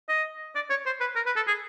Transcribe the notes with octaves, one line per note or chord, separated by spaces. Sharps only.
D#5
D5
C#5
C5
B4
A#4
B4
A4
G#4